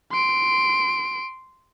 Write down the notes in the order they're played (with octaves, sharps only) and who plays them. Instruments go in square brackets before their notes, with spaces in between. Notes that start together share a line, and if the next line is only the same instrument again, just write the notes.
[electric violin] C6 D7